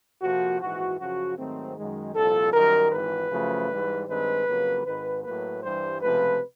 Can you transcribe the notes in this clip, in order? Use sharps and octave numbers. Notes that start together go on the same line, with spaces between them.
F2 C3 F3 A#3 F#4
A#1 G#2 E3 F#4
F#2 C#3 F3 F#4
G#2 D#3 F#3 A3 C4
F#2 D#3 G#3
C2 A#2 F3 A4
F#2 D#3 G3 A#4
G#1 G#2 E3 B4
F#2 C#3 F3 A3
G#2 E3 G3
G2 D#3 G#3 C4 B4
F2 C#3 F#3 A#3
G#1 G#2 D#3 B4
A2 F#3 A#3 B4
G2 E3 G3 C5
C#2 C3 F3 A3 B4